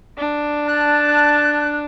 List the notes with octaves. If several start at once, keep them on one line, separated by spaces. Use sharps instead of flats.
D4
A5 F#6